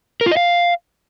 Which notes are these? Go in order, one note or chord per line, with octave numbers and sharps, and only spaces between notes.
A#4
F4
D#5
F5